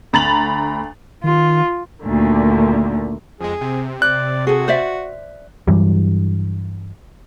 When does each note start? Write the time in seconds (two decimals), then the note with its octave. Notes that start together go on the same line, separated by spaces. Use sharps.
0.13 D2 A#5 B5 A6 F7 F#7
1.24 D#3 F4
2.02 D2 A#2 D3 D#3
3.41 F2 G#3 G#4
3.61 C3
4.02 D5 F#6
4.47 F#4 G#4 A4
4.68 C5 D5 E5
5.67 G2 E3 F#3 G3